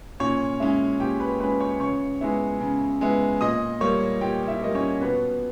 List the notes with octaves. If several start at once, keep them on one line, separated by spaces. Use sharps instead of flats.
A#2 C#4 C#5
G#3 C#4 E4 E5
A#2 G4 G5
B4 B5
G#3 C#4 B4 B5
C#5 C#6
C#3 C#5 C#6
G#3 B3 E4
C#3
G#3 B3 E4
A#2 D#5 D#6
G3 A#3 C#5 C#6
A#2 G4 G5
E4 E5
G3 A#3 D#5
C#4 C#5
B2 B3 B4